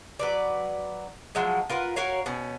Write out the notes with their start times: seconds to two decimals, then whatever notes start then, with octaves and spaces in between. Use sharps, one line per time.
0.19 F#3 B4 D5
1.35 F3 F#3 G#3
1.69 F4 A#4 B4 F#5
1.96 F#4 A#4 C#5 F5
2.26 B2 C#4